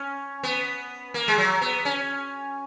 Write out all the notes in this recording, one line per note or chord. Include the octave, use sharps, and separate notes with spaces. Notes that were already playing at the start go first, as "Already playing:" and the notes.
Already playing: C#4
B3
A#3
G#3
F#3
B3
C#4